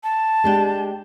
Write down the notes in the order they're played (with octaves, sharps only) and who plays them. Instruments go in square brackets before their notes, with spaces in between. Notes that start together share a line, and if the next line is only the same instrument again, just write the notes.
[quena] A5
[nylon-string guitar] G#3 D4 G4